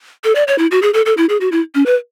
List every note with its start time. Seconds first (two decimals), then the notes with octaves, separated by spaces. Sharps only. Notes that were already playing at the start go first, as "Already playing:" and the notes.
0.24 A4
0.35 D5
0.48 C#5
0.59 E4
0.71 F#4
0.82 G#4
0.94 A4
1.06 A4
1.17 E4
1.29 G#4
1.41 F#4
1.52 E4
1.75 C#4
1.86 B4